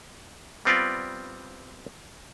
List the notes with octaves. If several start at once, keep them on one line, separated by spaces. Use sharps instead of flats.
G3 B3 C4 F4 G4 D5